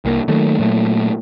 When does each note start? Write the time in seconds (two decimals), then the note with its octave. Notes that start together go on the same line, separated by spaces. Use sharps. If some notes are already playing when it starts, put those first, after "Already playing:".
0.05 C2 A#3
0.28 D#3 F#3 A3 A#3
0.59 A#2 F#3 A3